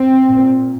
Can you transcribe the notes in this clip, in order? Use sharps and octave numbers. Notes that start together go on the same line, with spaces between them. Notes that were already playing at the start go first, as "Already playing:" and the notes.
Already playing: C4
A#2